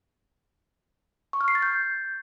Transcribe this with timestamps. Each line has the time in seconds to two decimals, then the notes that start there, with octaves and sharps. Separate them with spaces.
1.33 C#6
1.41 F6
1.48 C7
1.55 A6
1.62 G6